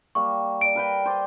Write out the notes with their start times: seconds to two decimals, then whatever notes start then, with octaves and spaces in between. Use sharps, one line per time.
0.15 G3 A#3 C#6
0.61 D5 D7
0.75 A#4 B4 G5
1.06 C5 D5